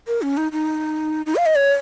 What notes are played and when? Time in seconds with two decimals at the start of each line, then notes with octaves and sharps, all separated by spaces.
0.07 A#4
0.22 C#4
0.37 D#4
0.52 D#4
1.26 D#4
1.36 F5
1.46 D#5
1.55 C#5